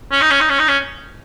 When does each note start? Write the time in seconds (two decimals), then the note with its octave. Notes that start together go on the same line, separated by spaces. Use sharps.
0.12 C#4
0.21 D#4
0.30 C#4
0.41 D#4
0.49 C#4
0.59 D#4
0.68 C#4